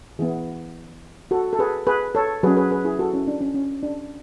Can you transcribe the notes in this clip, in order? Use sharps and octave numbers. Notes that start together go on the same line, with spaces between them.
E3 B3 E4 G#4
F#4 A4
A4
G#4 B4
G#4 B4
A4 C#5
F#3 C#4 G#4 B4
G#4 B4
G#4 B4
E4 G#4
F#4 A4
C#4 E4
D4
C#4
C#4
D4